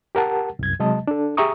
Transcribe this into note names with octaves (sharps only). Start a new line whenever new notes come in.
G4 A#4 F#5 A5
C2 F#2 G#6
C3 F#3 G#3 D#5 A5
D4 A4
G4 G#4 E5 A#5 C#6 D#6